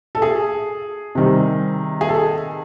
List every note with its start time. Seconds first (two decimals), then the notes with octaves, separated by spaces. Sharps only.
0.15 A4
0.22 G#4
1.15 C3 D#3 G3 C4
2.01 G#4
2.09 A4